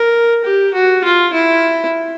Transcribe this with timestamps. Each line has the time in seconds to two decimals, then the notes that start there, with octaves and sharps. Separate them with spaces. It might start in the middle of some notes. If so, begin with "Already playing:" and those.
Already playing: A#4
0.45 G4
0.74 F#4
1.04 F4
1.33 E4